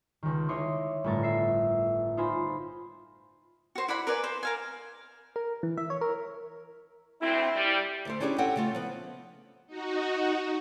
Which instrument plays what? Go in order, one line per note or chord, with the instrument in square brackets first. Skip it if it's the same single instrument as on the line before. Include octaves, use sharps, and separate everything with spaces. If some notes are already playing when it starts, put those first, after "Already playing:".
[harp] C#2 D#3
E4 C#5 D#5 C6 D6
G1 A2 A3 A#4 A6
E5 C7
D#4 F4 C5 G#5 B5 C6
[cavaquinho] F#4 C5
E4 D5 F#5 B5
A#4 B4 D5 G#5
C5
A#4 F5 G#5
[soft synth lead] A#4
E3
E5
C#5
A#4
[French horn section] D2 C4 [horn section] E4
[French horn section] G3
[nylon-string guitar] D2 A3 C5
C#4 D4 E4 G4 G#4 D5
C4 C#4 A4 F#5 G5
C#3 A3 F4
F3 B3
[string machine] D#4 F#4